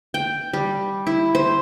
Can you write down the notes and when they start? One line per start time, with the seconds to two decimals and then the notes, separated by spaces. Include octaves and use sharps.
0.14 G5
0.53 G3
1.07 E4
1.35 C5